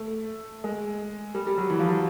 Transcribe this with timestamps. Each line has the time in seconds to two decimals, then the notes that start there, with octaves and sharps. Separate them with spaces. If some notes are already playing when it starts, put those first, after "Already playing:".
Already playing: A3
0.64 G#3
1.35 G3
1.47 G3
1.58 F#3
1.70 E3
1.79 F3
1.88 F#3